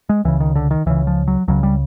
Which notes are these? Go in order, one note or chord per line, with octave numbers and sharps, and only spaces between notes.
G#3
C#2 C#3 E3
D#3
D3
D#3
C#2 C#3 E3
F3
F#3
C#2 C#3 F#3
G3